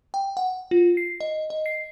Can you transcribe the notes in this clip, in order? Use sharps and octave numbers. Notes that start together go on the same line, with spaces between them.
G5
F#5
F4
C7
D#5
D#5
C7